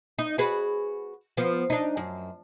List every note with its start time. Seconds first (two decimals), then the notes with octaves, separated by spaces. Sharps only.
0.19 D#4
0.38 F#4 G#4 B4
1.37 F3 B3
1.70 D4 D#4
1.97 F#2